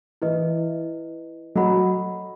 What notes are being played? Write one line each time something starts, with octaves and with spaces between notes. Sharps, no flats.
E3 E4 B4 D#5
F#3 A4 D#5 F#5 B5